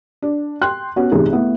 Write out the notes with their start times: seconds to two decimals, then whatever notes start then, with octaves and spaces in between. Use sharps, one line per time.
0.22 D4
0.61 G5 C6 F#6
0.96 B3 C#4 F#4
1.11 A1 G2 C3 D#4 G#4
1.31 A3 B3 E4